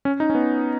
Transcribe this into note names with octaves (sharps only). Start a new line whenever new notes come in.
C#4
D#4
C#4
B3